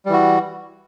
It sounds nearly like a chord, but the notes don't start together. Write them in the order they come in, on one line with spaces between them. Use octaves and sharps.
G3 E3 F#4